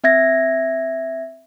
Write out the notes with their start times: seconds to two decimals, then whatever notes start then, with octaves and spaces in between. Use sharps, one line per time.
0.04 C4 E5 G#6 A#6